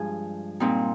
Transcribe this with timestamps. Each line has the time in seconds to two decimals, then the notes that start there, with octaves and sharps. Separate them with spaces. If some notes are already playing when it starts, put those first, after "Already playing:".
Already playing: G2 F3 G#3 G#4
0.60 A#2 G3 C4 D#4